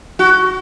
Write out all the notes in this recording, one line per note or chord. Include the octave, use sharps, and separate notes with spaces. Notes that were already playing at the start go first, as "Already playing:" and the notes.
F#4